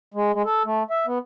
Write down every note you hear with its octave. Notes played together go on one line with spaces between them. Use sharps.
G#3
G#3
A4
A3
E5
B3